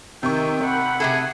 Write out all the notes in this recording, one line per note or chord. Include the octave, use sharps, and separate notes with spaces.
C3 D#3 G5 C#6
F#5 B5
C3 A3 G#4 A4